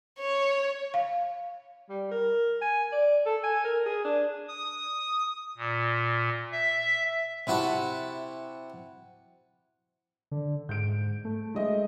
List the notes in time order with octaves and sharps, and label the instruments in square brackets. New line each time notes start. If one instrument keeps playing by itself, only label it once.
[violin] C#5
[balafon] F5
[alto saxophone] G3
A#4
G#5
D5
A4
G#5
A#4
G#4
D4
[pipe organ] D#6
A#2
E5
[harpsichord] C3 E4 F#4 A5
[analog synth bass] D3
[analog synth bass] G#2 [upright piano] G6 D7
[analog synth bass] A3
[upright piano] G#3 D#5 E5